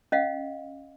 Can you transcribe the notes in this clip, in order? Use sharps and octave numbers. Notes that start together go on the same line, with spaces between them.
C#4 D#5 F5 F#5